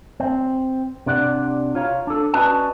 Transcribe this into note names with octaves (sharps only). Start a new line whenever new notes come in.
C4
C3 D4 D5 F#5
F4 C#5 F5 A#5
D4 A4
C#4 F#4 B4 D5 D#5 A5